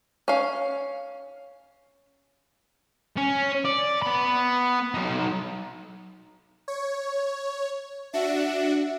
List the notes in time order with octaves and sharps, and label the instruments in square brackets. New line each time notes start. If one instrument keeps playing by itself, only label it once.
[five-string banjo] C#4 F5
[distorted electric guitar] C#4
D5
B3 B5
F#3 D#4
[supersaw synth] C#5
[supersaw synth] D4 F#4 [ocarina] E5